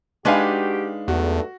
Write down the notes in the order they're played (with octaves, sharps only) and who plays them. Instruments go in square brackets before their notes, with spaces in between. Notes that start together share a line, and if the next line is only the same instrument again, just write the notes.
[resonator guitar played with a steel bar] G#3 D#4 B4 [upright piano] D4 F5 [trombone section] F#4 G4
[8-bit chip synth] E2 [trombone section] G2 A3 [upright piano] F#4